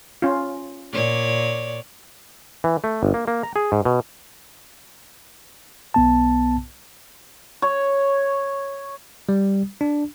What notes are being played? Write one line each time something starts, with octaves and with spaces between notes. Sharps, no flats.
C#4 F4
A#2 C#5 D5
E3
A3
G1
A#3
A#3
A#5
G#4
G#2
B2
B1 B3 A5
C#5
G3
D4